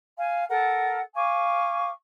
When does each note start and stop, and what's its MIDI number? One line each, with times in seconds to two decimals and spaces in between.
0.17 0.44 77
0.17 0.44 80
0.49 0.99 69
0.49 0.99 70
0.49 0.99 78
1.14 1.88 77
1.14 1.88 80
1.14 1.88 85
1.14 1.88 86